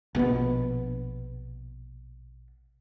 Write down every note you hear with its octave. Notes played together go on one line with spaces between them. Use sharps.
A#1 B2 D#3 B3